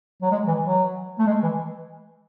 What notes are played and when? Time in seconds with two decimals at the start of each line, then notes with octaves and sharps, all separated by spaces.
0.22 F#3
0.31 G#3
0.47 E3
0.64 F#3
1.19 A3
1.27 G#3
1.43 E3